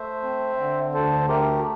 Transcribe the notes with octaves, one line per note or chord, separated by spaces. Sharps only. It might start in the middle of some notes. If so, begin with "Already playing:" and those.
Already playing: A3 C5 E5
C4
D3
D2 A4 C5
A3 G4 A#4